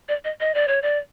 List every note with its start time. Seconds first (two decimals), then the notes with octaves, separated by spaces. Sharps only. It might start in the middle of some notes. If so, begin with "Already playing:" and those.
0.08 D5
0.25 D#5
0.40 D#5
0.54 D5
0.68 C#5
0.82 D5